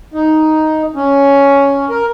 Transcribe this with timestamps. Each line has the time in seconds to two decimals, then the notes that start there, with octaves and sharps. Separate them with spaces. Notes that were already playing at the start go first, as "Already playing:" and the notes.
0.14 D#4
0.96 C#4
1.90 A#4